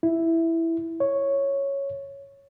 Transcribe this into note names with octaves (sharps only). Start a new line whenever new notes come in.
E4
C#5